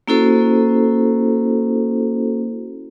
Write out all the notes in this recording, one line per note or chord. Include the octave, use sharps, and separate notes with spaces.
A#3 C#4 E4 F#4 A4 C5